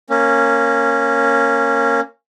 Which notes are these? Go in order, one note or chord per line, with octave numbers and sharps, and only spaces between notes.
A#3 C#4